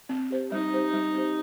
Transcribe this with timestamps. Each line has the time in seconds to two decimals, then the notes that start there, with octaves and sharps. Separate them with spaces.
0.09 C4
0.30 G4 C5
0.51 G3 D#4
0.72 C4 G4 C5
0.93 G3
1.14 C4 G4 C5